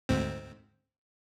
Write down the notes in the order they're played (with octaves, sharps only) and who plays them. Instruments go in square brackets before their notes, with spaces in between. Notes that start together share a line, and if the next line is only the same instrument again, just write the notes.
[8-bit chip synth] D2 G#2 C4